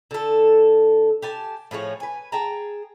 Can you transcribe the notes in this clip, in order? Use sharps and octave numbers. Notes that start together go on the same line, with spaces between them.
D3 A4
G4 G#5 A5
A2 F3 G#4 C#5
B4 G#5
G#4 G5 A5 A#5